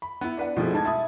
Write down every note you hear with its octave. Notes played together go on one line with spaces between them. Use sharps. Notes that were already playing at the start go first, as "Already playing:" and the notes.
B5
B3 E4
D4 B4 F#5
B2 F3 A3 C4 E4 G#4
G#2 A5 G#6
E5 A5 B5 D#6